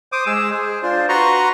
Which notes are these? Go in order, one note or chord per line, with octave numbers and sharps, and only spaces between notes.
C5 D6 D#6
G#3 G#4 E6
G#4 C5
D4 F4 C5
F#4 B4 A#5 C6 C#6